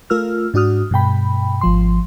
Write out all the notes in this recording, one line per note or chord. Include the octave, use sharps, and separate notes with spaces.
A3 F4 A#4 E6 F6
G#2 D4 F#4 D#6 F6
G2 B2 G5 B5
G#1 F3 C6